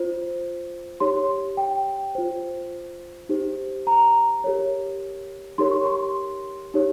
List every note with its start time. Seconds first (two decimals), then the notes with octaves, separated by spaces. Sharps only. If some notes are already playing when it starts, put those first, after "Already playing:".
Already playing: F4 C5
1.00 D#4 G4 C#5 C6
1.57 G5
2.15 F4 C5
3.29 D#4 G4 C5
3.87 A#5
4.44 G4 A#4 C#5
5.58 D#4 G4 A#4 C#5 C6
5.71 C#6
5.86 C6
6.74 D#4 G4 C#5